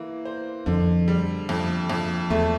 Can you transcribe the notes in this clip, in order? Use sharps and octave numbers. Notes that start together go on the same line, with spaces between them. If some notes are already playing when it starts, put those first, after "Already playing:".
Already playing: E3 A#3
C5
F2 D3
G3
F2
F2
E2 A3